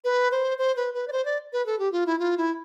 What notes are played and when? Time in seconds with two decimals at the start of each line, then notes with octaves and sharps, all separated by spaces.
0.04 B4
0.32 C5
0.58 C5
0.76 B4
0.94 B4
1.08 D5
1.12 C5
1.25 D5
1.53 B4
1.66 A4
1.79 G4
1.92 F4
2.06 E4
2.19 F4
2.38 E4